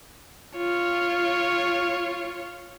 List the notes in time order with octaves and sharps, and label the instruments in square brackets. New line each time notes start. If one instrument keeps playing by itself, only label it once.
[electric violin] F4 C#5